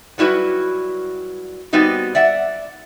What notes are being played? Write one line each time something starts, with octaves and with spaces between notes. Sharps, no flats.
F#3 G3 E4 F#4 B4
G3 B3 C4 D#4 F#4
D5 E5 F#5